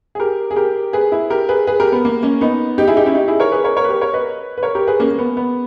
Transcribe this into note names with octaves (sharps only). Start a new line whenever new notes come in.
G#4
G4 A#4
G#4
G4 A#4
G#4 B4
E4 G#4
G4 A#4
G#4 B4
G#4 B4
G4 A#4
B3
A#3
A#3 C#4
B3 D#4
D#4 G4
E4 G#4
D#4 G4
C#4 E4
D#4 G4
E4 G#4
A#4 C#5
G#4 B4
A#4 C#5
A#4 C#5
B4
G4 A#4
A#4 C#5
B4 D#5
B4
A#4 C#5
G4 A#4
G#4 B4
A#3 C#4
A#3
B3
B3